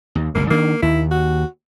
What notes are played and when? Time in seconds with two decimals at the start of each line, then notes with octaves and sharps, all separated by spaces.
0.15 D#2
0.35 G1 C#2 A#2 A#3
0.50 D#3 A#3 D4
0.83 D#2 D#3 E4
1.11 F#4